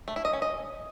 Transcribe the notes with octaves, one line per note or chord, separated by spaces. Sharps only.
A3
E4
D#5
C#4
D#5